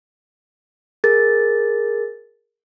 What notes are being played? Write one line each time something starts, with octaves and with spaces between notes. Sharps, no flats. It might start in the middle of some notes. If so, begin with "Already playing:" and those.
G#4 A#4 A6